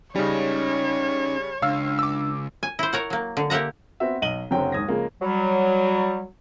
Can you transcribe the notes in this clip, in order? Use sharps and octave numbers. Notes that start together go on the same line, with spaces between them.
C#3 G3 C#4 D#4 C#5 D#5
C#2 D4 F5 E6
D6 E6
G#5
E4 C5
A#4 C#5 F#5
F#3 A#3
D3
A#3 G4 E5 F#5 A#5
B3 C4 F#4 E5
B1 D#5 D#7 F#7 G7
F#1 F#2 D3 F#3 C4 G5
D#2 G#2 D#6 G#6 A#6
C#3 F3 G#3 A#3
F#3 G3